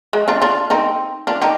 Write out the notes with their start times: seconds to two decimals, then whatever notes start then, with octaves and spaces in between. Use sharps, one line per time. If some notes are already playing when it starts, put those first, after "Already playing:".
0.13 G#3
0.28 D4 F4
0.42 D4 F4
0.70 C4 D#4
1.27 D4 F4
1.42 D#4 G4